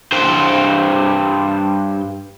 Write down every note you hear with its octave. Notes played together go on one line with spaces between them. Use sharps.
G2 C5